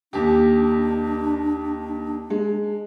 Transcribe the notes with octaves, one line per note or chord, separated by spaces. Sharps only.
D#2 D4 G4
G#3